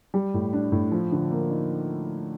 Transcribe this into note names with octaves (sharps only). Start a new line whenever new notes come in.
G3
A2
D4
A2
F3
D3
A#3
D#4